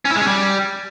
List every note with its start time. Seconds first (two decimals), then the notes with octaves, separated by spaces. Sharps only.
0.05 C#4
0.10 E4
0.16 G#3
0.21 C#4
0.26 G3